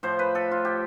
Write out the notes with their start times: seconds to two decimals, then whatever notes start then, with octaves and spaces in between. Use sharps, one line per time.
0.03 A2 F3 C5
0.19 B4
0.35 A4
0.51 F4
0.65 G4